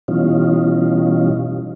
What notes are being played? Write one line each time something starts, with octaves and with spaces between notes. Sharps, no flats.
B2 E3 G3 C#4 D#4 F4